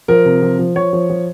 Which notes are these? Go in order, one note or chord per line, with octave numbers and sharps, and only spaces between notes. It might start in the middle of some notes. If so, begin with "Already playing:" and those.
F3 A#4
C3
F3
F3
F3 C#5
F3
F3